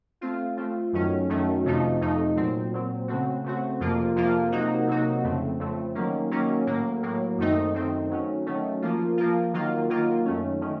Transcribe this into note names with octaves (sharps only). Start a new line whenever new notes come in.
A3 C4 F4
A3 C4 F4
F#2 D#3 F#3 A3 C#4
F#2 D#3 F#3 A3 C#4
F2 C3 F3 A3 D#4
F2 C3 F3 A3 D#4
A#2 F#3 C4
A#2 F#3 C4
C#3 A3 C4 F#4
C#3 A3 C4 F#4
F2 C3 F3 A#3 F4
F2 C3 F3 A#3 F4
C3 F#3 A#3 D#4 F#4
C3 F#3 A#3 D#4 F#4
F2 C#3 A3 C4
F2 C#3 A3 C4
D#3 F#3 A#3 C#4
D#3 F#3 A#3 C#4
A2 F#3 A#3
A2 F#3 A#3
F#2 D#3 A3 C4 D#4
F#2 D#3 A3 C4 D#4
D#3 F#3 A3 C#4
D#3 F#3 A3 C#4
F3 A#3 F4
F3 A#3 F4
D#3 F#3 A#3 F4
D#3 F#3 A#3 F4
F#2 D#3 A3 C#4
D#3 A3 C#4